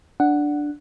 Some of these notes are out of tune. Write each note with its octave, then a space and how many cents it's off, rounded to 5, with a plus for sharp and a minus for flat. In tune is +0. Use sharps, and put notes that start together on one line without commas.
D4 +0 F#5 +0